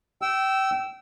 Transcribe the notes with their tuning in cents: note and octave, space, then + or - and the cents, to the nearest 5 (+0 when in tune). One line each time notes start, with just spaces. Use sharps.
G5 -25 E6 +0